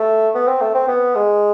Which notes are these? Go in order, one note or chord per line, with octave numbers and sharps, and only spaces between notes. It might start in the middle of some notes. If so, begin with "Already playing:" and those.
Already playing: A3
B3
C4
A3
C4
B3
G#3